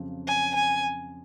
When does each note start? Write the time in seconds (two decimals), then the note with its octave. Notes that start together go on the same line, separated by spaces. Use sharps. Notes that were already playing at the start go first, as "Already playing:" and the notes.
Already playing: F2 C#3 F#3
0.27 G#5
0.55 G#5